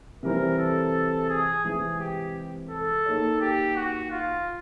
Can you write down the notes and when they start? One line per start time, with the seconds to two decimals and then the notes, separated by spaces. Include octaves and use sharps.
0.23 C3 E3 G3 C4 A#4
0.58 A4
1.30 G#4
1.64 C3 E3 G#3 C4 G#4
2.00 G4
2.70 A4
3.06 A#3 D#4 G#4 C#5
3.41 G4
3.76 F#4
4.11 F4